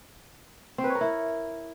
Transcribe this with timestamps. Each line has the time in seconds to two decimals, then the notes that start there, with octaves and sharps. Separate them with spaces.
0.78 C4
0.84 B4
0.90 C#5
0.95 A#4
1.01 E4